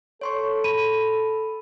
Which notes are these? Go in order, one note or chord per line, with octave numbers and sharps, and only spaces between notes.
A4 C#5 C6 C#6
B5 D#7